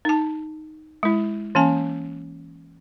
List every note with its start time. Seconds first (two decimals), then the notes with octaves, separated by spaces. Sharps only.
0.05 D#4 A5
1.03 G#3 E4
1.55 E3 A#3 C#4 G#5